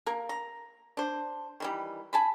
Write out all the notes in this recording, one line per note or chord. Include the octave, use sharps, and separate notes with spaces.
A#3 A#4
A#5
D4 C5
D#3 E3 G3
G#5 A5 B5